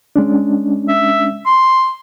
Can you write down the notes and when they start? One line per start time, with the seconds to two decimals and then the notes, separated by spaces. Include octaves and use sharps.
0.16 G#3 C#4 D4
0.89 E5
1.46 C6